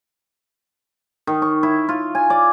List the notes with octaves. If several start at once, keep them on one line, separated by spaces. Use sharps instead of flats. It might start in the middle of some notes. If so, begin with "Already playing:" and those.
D#3
C#6
E4
F4
G#5
D5